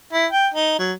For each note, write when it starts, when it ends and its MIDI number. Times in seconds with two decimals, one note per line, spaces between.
0.13 0.26 64
0.32 0.48 79
0.54 0.75 63
0.79 0.93 54